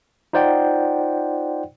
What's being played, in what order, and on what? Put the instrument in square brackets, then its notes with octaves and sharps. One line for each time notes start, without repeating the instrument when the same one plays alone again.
[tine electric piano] D#4 F4 C5 D5 F#5 G5